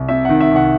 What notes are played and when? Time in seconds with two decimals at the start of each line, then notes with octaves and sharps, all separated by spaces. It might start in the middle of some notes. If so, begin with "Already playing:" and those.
Already playing: C2
0.09 C3 E5
0.25 D#3 F#5
0.41 E5
0.51 C2 F#5